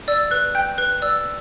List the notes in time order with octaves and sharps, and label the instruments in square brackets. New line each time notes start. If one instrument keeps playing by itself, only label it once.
[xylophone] D5 E6
B4 F#6
G5 G6
B4 F#6
D5 E6